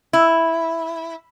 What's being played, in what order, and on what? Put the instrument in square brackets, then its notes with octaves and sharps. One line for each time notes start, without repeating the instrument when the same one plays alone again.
[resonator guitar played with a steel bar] E4